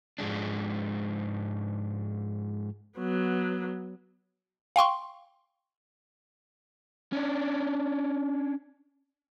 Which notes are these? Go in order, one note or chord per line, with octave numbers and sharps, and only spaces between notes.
G#2 F3 G#3 D4
F#3 B3
F5 G5 C6 C#6
C#4 D4